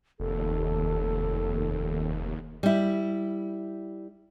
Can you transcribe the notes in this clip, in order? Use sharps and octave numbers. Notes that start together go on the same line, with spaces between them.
F1 D#2 A4
G3 E4